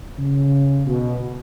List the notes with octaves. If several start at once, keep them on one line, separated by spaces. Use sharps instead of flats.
C#3
B2